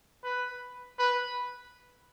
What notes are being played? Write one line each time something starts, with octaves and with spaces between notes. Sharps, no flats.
B4
B4